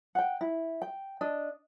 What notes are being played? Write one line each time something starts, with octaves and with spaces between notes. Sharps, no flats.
F#5 G5
E4
G5
D4 D#5